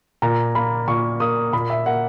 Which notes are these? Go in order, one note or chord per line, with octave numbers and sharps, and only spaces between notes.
A#2 A#5
A#3 B5
A#2 C#6
A#3 D#6
A#2 B5
E5
A#3 F#5